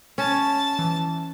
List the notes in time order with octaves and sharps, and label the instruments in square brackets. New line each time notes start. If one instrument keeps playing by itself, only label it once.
[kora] C#4 [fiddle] A5
[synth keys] E3